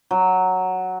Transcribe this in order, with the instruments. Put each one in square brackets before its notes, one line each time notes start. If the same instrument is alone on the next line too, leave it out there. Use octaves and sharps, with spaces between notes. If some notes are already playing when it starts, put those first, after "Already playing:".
[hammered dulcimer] F#3